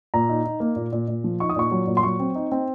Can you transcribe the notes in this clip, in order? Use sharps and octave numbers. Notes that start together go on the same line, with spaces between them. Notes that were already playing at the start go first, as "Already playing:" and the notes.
A#2 A#5
D#4
D#4
A#3
A#2
A#2
A#2
F3
D#4 C#6
D#6
A#2 C#6
F#3
A#2
C6
F#3 C#6
C4
D#4
C4